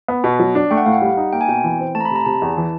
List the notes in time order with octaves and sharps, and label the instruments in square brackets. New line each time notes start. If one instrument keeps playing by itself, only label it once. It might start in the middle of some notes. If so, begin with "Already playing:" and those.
[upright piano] B3
B2
F#3
D4
[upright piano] A3 [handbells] G5
[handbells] F#5
[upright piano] A2 [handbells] F5
[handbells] F#5
[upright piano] G3
D#4
[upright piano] A#3 [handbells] G5
[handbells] G#5
[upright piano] B2 [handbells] G5
[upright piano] E3
C4
[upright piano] A3 [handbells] A5
[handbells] A#5
B5
[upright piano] C3 [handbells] A#5
[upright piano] C3 [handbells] A5
[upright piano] E2
E3